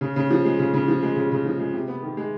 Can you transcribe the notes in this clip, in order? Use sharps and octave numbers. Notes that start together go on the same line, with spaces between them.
C#3
C#3
F3
G#3
C#3
C#3
F3
G#3
C#3
C#3
F3
G#3
C3
B3
D#3
G#3